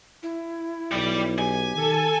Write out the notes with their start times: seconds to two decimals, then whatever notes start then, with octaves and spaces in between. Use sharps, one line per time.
0.23 E4
0.92 B1 G3 D5
1.38 G4 G#5
1.76 D#3 A4